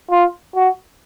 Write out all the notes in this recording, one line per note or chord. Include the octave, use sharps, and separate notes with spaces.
F4
F#4